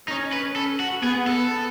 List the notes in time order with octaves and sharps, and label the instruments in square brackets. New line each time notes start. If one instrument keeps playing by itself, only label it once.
[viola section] C#4 [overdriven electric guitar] D#4
[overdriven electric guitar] B4
A4
F#4
[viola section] B3 [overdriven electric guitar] G#4
[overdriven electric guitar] A4